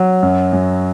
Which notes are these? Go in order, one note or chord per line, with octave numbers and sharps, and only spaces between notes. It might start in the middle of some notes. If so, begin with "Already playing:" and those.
Already playing: F#3
F#2
F#2